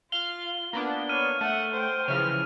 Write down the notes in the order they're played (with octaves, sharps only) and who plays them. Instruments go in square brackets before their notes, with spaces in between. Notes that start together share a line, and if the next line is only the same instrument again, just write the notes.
[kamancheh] F4 [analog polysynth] F5 F6 [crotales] G7
[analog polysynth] A#3 B3 D4
[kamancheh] C#5 [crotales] F6 D#7
[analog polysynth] A3 [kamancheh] F#5
[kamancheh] C5 G5
[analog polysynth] C#3 E3 F3 [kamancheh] F6